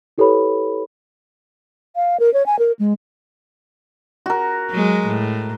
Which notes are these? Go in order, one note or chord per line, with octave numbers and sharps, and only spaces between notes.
E4 G4 A4 B4 C#5 B5
F5
A#4
C#5
G#5
A#4
G#3
F#4 A#4
F#3 G#3
A2